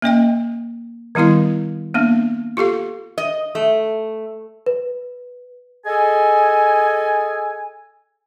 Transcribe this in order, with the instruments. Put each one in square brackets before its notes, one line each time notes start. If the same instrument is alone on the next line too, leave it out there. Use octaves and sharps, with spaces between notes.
[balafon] A#3 C#4 D#5 G5
D#3 G3 B3 E4 F5
A#3 B3 D4
F4 G4 A4 F5
[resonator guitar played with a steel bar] D#5
A3
[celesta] B4
[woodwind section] G#4 A4 D#5 G#5